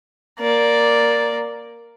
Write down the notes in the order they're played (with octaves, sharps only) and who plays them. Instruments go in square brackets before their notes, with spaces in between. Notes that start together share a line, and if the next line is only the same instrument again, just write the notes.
[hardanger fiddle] A#3 D5